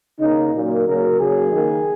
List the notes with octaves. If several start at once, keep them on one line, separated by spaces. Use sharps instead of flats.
C#3 A#3 D#4
A#2 F#3 A#3
C#3 F#3 A#3 A#4
C#3 F#3 A#3 G#4
D#3 A#3